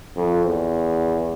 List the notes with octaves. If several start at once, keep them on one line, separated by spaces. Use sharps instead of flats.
F2
E2